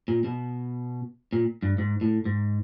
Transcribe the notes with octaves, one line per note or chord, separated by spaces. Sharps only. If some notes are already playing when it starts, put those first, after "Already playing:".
A#2
B2
A#2
G2
G#2
A2
G#2